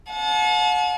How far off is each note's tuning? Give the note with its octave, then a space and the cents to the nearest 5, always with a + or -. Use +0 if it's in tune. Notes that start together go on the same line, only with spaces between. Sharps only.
F#5 -45 A5 -40